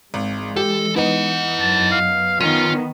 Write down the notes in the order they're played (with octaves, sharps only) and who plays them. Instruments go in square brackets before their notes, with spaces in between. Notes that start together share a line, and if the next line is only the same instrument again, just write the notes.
[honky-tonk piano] G#1 [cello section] E3 G#3
[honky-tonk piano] G4 [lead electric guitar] A4
[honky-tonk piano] B3 D#4 [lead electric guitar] E4 F#5
[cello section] F#2 [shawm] A5
[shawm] F5
[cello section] D#3 B3 [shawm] C#4 [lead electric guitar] F4 [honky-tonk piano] D#7